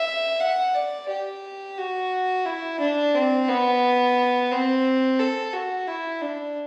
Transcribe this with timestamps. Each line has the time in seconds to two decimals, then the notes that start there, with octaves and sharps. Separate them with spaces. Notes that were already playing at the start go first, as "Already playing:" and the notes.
Already playing: E5
0.40 F#5
0.75 D5
1.08 G4
1.78 F#4
2.45 E4
2.80 D4
3.14 C4
3.48 B3
4.51 C4
5.19 A4
5.53 F#4
5.88 E4
6.22 D4